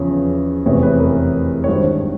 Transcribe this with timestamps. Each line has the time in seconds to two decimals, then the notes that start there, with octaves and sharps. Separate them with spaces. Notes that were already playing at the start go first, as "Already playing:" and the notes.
Already playing: E2 C#3 F3 C#5
0.66 F1 E2 C3 E3 C#5
0.83 B4
0.99 A#4
1.64 C#5
1.68 G#1 G2 D#3 C5